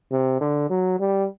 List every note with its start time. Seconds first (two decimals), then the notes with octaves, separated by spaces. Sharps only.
0.12 C3
0.41 D3
0.70 F#3
1.00 G3